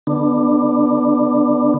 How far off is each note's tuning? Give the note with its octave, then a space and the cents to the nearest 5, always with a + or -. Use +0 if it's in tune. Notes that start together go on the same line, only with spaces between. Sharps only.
D3 +0 B3 +0 D4 +20